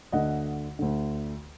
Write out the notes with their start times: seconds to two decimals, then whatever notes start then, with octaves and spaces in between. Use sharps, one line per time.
0.12 D2 D3 D#5 F#5
0.79 D2 D3